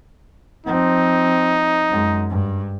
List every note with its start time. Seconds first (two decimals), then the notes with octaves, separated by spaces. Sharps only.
0.66 F3 C4 D#4
1.89 F#2 G#3
2.30 G2